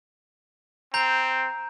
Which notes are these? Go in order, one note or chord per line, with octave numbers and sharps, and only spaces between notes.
C4 A#5 G6